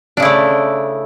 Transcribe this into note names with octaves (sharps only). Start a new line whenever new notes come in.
C#3 A3 D4 E4